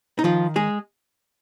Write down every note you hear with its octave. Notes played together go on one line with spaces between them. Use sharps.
D#4
D#3 F3 F4
G#3 G#4